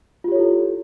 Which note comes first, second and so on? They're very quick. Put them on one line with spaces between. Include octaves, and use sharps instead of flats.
F4 G4 C#5 A4 E4